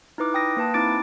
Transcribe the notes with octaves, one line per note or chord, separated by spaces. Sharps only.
D#4 E4 B4 D6
G5 D#6 A#6
A#3 B4 A5
C4 D#4 E4 D6 A6 D7